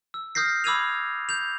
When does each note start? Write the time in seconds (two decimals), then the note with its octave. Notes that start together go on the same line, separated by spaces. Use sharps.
0.14 E6
0.35 D#6 F6 G6 A#6 C7
0.64 B5 D6 E6 G#6 D#7 F7
1.29 G6 F7